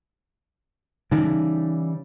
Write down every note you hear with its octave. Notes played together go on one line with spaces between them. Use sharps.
C#3 E3 G3 D#4